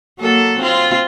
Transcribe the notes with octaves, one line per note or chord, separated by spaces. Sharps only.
F#3 A#3 A4
C4 F4